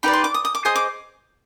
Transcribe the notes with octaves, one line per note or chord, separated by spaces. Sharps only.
D#4 G4 B4 D5 B5
C6
D6
D#6
D#6
D6
G#4 C5 D#5 D#6
D6